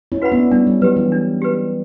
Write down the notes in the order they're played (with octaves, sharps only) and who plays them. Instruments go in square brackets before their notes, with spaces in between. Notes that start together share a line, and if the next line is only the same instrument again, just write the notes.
[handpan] C#4 E4
[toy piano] F#4 B4 F#5 B5
[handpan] B3 D4
[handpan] G3 B3 [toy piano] D4
[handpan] G3
[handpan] F#3 [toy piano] G4 B4
[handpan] E3
[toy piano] D4
G4 B4